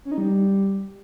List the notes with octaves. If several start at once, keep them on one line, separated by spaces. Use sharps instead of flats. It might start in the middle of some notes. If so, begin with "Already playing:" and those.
C#4
D#4
G3